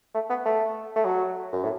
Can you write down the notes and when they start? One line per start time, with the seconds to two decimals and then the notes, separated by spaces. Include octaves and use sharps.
0.14 A3
0.29 B3
0.45 A3
0.96 A3
1.05 F#3
1.52 F#2
1.64 A2